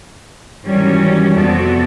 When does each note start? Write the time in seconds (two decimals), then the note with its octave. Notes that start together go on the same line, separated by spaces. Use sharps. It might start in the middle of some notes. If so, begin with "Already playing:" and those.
0.64 G#2 D#3 E3 F#3 G3 C#4
1.32 F2 C3 B3 F#4 A4 D5